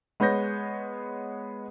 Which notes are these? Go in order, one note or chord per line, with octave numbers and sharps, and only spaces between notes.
G#3 B3 C#5 G6 A#6